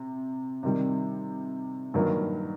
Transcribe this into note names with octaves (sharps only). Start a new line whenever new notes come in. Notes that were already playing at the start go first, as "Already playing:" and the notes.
Already playing: C3
C3 D#3 G3
G2 D#3 F#3 A#3